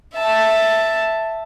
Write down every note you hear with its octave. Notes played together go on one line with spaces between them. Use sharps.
E5 A5